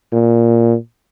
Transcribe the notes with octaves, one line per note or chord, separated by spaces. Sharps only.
A#2